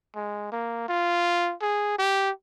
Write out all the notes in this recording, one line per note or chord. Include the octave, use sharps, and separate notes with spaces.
G#3
A#3
F4
G#4
G4